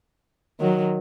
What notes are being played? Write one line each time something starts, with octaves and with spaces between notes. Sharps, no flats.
D#3 F#3